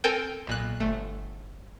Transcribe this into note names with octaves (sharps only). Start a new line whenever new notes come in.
C4 A4 A#4 G5 G#5
B1 A#2 F#6
G1 A3